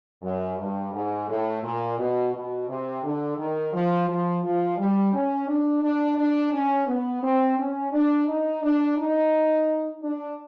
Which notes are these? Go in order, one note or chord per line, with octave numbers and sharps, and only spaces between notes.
F#2
G2
G#2
A2
A#2
B2
B2
C3
D3
D#3
F3
F3
F3
G3
C#4
D4
D4
D4
C#4
B3
C4
C#4
D4
D#4
D4
D#4
D4